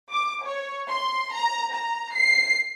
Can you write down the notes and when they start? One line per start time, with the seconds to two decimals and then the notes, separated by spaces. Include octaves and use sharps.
0.11 D6
0.45 C#5
0.89 C6
1.33 A#5
1.73 A#5
2.14 C7